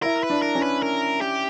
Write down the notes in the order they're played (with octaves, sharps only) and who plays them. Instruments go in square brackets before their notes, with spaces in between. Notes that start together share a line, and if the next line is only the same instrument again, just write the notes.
[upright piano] E4 [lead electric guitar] A#4
[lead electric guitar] B4
[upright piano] D4
[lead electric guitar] A#4
[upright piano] C#4
[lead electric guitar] B4
A#4
G4